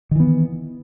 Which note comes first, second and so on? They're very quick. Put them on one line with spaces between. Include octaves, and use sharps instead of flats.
D#3 E3 B3